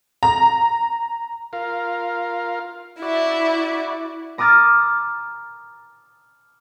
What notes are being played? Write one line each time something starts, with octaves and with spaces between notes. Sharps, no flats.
A#5
F4 A#4 F5
E4 F#4 D5
A#5 D6 D#6 F6 A6